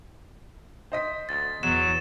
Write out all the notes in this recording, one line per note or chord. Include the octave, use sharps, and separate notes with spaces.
C5 D#5 B6
D2 A6
E2 F#3 E7